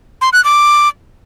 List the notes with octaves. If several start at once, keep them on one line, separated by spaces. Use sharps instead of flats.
C6
F#6
D6